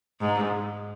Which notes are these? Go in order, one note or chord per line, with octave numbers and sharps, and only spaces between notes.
G#2